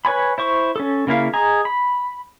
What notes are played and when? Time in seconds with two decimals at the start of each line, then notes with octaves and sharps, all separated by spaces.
0.05 B4 C#5 G#5 B5
0.38 E4 C5 C#6
0.76 C#4 A4
1.07 C#3 A#3 E4 F5
1.33 G#4 D#5 G#5 A#5
1.65 B5